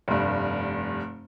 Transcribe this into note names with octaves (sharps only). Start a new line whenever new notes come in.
F1 G2